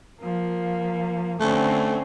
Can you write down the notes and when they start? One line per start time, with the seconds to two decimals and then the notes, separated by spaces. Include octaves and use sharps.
0.20 F3 A#3
1.41 D3 A3 C4 C#4